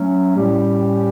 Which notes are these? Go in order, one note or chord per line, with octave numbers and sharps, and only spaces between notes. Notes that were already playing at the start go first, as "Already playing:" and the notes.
Already playing: F#3 A3 C#4
A2 G3 C#4 G4